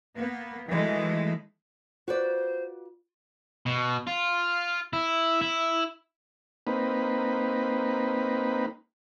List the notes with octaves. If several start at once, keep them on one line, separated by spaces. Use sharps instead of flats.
A#3 B3
D#3 E3 F#3 G#3 A3
F4 F#4 B4 C5 D5
B2
F4
E4
E4
A#3 C4 D#4 B4